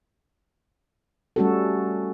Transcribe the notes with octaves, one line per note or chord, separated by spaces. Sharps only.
G3 A3 C#4 F#4 G4 A4